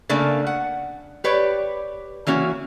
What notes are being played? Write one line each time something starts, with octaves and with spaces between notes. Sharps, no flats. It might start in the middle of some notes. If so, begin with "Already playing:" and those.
C#3 A3 A#3 D4
F#5
G4 B4 C#5 D5
E3 A#3 C#4 F#4